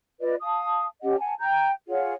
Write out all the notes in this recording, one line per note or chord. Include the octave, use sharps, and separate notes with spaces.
F4 B4 D5 D#5
F5 A5 D#6
C#4 G4 D#5 F#5
F#5 G#5 A5
G5 A#5 G6
F4 G#4 C#5 F#5